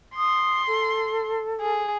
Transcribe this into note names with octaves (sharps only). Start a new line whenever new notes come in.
C6 D#6
A4
G#4